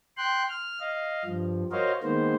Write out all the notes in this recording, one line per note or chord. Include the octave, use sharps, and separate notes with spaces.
G5 C6 F#6
F6
D#5 F5
G2 F3
F#4 A#4 C5 C#5 D#5 F5
D#3 G#3 A#3 B3 C5